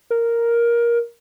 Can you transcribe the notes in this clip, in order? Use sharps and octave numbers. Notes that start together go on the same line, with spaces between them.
A#4